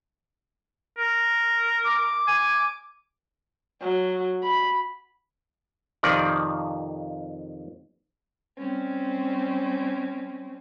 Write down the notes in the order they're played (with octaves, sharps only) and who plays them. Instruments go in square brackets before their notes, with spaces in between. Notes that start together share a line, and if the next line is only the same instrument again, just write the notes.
[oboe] A#4
[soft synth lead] D6
[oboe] G#5
[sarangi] F#3
B5
[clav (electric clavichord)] F2 C3 D#3 F3 D5
[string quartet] G3 C4 C#4